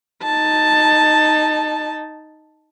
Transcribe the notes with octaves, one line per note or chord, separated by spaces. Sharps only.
D#4 A5